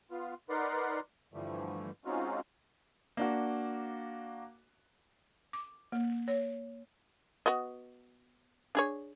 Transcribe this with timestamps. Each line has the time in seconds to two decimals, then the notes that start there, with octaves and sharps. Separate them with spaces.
0.11 B3 F4
0.49 D#4 A#4 B4 D5 F#5 C6
1.34 G2 D3 E3 F3 G3 A3
2.05 G#3 C4 C#4 D#4 F4 F#4
3.17 A#3 D4 F#4
5.53 D6
5.92 A#3
6.28 C#5
7.46 B3 F#4 D#5
8.75 D4 G#4 C#5